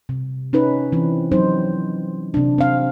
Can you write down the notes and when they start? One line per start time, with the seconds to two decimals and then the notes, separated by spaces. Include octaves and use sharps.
0.09 C3
0.53 C#4 D#4 B4
0.92 E3 C4
1.32 F3 F#3 C4 D#4 C5
2.34 C3 D4
2.58 C4 F5